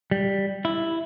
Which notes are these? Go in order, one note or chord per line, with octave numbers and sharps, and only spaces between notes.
G3
E4